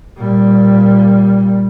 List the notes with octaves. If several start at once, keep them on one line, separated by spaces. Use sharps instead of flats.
A#2 G3